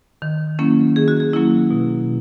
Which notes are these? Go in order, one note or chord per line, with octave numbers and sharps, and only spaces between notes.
D#3
F#3 A#3 C#4 E4
D#3 G#4
F#4
G#4
F#3 A#3 C#4 E4
B2